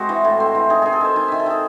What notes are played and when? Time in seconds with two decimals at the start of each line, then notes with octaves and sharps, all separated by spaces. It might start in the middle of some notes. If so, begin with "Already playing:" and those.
Already playing: G#3 C4 F#4
0.09 E3
0.24 A2
0.40 C4
0.55 E3
0.70 D#3 G#4
0.82 D#3 G#4
0.93 A4
1.01 D#3 C5
1.16 D#4 G#5
1.28 D#3 E5
1.40 A4
1.46 D#3 G#4